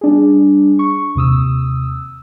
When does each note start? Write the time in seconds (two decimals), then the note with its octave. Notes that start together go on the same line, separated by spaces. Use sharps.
0.01 G3 D4 G#4
0.79 C#6
1.15 D#2 C3 D#6 E6